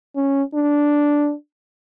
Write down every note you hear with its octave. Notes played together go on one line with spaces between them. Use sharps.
C#4
D4